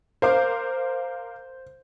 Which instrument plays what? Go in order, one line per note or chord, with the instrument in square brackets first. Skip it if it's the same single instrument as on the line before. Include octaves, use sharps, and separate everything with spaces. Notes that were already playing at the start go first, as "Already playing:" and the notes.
[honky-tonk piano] A#4 F5 D6 [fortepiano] C5